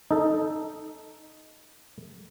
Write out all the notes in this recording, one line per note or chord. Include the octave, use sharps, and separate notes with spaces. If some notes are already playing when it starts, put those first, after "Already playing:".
D#4 A4